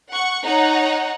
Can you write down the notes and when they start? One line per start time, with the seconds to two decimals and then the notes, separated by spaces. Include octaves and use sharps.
0.10 F#5 C#6
0.43 D#4 C#5 F#5 A#5